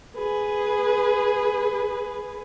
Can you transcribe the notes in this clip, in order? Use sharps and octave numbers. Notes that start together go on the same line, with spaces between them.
G#4 B4